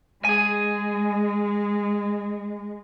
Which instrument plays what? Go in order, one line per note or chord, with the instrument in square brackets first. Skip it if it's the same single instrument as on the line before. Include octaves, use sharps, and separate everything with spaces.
[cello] G#3 [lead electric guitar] G#4 G#5